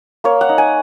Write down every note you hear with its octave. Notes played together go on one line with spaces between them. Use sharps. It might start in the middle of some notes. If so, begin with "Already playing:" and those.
A#3 C#5
F#5
D#4
G#5